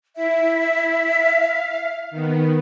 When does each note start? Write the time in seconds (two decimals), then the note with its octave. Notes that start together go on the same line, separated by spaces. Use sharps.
0.16 E4 E5
1.16 F5
2.11 D#3 B3